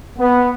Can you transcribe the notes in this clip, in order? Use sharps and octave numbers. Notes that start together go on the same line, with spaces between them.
B3